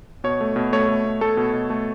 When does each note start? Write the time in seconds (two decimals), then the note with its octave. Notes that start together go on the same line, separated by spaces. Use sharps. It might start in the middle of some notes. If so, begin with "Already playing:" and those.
0.24 B2 C#5
0.41 A3
0.56 B2
0.73 A3 C#5
0.89 A3
1.05 B2
1.21 A3 A4
1.37 B2
1.53 B2
1.70 A3